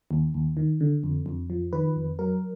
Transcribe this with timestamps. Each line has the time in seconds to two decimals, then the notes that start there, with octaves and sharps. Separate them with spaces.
0.11 D#2
0.34 D#2
0.57 D#3
0.81 D3
1.04 F2
1.26 F2
1.50 F3
1.73 D#3 B4
1.96 F2
2.19 F#3 A#4